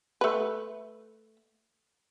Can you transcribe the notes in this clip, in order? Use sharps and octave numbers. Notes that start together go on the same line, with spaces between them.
A3 B4